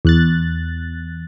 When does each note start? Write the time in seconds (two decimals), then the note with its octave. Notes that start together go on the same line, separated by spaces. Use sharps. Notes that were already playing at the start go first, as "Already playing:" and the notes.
0.05 E2 F#6 A6